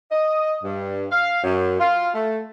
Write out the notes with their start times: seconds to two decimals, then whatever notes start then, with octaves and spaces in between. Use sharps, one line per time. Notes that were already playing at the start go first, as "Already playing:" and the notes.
0.11 D#5
0.63 G2
1.11 F5
1.43 F#2
1.80 F4
2.15 A3